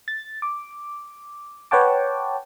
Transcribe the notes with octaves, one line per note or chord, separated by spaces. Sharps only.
A6
D6
B4 C#5 F#5 G5 A5 D6